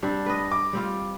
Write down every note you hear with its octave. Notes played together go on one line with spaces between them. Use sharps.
G3 C4 D4
B4 D#5
D6
G3 C4 F4